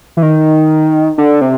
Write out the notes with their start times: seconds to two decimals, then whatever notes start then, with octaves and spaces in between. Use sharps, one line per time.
0.17 E3
0.22 D#3
1.18 D3
1.41 C3